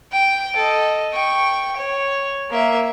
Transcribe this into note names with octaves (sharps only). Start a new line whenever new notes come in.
G5
A4 D#5
G5 C#6
C#5
A#3 E5